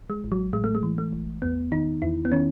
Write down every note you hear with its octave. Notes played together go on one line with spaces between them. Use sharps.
G#3
A1
F#3
A2 G#3
A3
G#3
E3
A3
A1
E2 B3
D#3 D#4
E2 E4
B3
D#3 C#4